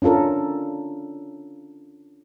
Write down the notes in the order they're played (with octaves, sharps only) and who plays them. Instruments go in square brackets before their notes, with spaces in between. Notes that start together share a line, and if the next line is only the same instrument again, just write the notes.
[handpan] C#4 D4 F4 A4 A#4